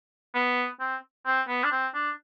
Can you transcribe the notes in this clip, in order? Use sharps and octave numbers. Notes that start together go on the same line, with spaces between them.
B3
C4
C4
B3
D4
C4
D4